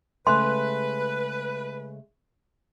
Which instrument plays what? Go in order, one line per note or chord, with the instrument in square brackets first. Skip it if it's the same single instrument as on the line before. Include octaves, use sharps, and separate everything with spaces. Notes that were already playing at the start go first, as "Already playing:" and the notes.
[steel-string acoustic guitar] C#3 G#3 A3 [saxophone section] B4 [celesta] E5 G#5 F#6 [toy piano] C6